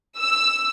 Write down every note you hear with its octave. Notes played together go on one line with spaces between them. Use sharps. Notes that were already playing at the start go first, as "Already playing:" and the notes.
E6